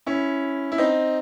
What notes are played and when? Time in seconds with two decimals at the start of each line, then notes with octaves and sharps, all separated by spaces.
0.06 C#4 E4
0.72 E4
0.78 C4 D#4